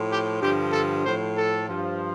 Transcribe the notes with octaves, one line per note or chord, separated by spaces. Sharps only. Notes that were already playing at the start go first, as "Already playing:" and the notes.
Already playing: A2 F3
G4
G2 D3 F3 G4
A4
A2 F3 C5
A4
G2 F3